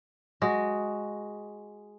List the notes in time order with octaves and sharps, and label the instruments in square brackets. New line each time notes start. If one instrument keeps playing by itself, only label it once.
[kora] G#3 F#4